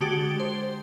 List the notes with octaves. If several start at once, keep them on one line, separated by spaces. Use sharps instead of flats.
D3 G#3 F#4 G4 A6 D7
C5